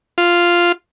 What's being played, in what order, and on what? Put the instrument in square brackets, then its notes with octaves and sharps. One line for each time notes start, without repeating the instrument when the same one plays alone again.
[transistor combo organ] F4